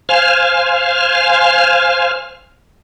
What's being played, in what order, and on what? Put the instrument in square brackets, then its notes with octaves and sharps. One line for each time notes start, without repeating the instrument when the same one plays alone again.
[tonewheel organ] C5 F5 G#5 F6